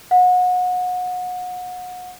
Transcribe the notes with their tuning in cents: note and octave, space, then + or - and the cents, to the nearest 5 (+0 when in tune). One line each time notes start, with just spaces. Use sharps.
F#5 -30